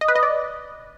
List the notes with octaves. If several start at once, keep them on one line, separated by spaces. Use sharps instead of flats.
D#5
B4
D#5
D5